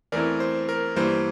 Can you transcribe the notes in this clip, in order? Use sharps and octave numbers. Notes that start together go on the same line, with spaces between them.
E2 E3 A3 C4 E4 A#4 D5
C5
A#4
G2 E3 G3 A#3 C5